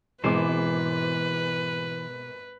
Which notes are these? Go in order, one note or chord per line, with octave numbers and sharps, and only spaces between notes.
G#1 B2 E3 G#3 B4 C5 D6